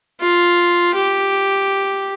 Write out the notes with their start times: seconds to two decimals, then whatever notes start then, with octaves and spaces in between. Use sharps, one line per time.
0.21 F4
0.94 G4